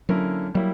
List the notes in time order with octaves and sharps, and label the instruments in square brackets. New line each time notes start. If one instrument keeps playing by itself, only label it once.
[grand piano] D3 A#3 C#4 E4 A#4 [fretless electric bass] F#3
[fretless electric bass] F#3 [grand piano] G3 A#3 E4